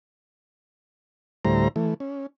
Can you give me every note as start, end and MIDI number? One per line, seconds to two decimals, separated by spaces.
1.45 1.68 38
1.45 1.68 45
1.45 1.68 55
1.45 1.68 64
1.45 1.68 72
1.45 1.68 82
1.76 1.94 52
1.76 1.94 57
2.00 2.26 61